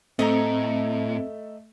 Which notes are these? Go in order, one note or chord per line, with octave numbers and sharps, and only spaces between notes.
A2 A3 C4 D#5 E5 A#5